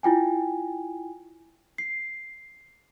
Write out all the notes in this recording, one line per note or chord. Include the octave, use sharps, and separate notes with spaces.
E4 F4 G5 G#5
C7